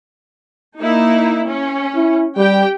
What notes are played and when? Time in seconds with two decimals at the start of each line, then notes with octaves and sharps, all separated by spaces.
0.79 A#3 D#4 E4
1.47 C#4
1.95 E4
2.37 G3 G4 G5